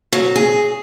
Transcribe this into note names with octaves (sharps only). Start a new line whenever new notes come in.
F#3
G#4